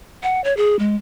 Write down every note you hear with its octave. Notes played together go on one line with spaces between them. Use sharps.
F#5
C#5
G#4
G#3